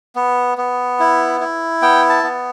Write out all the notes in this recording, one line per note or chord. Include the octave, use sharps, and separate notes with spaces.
B3
B3
E4
E4
B3 G5
A5
B3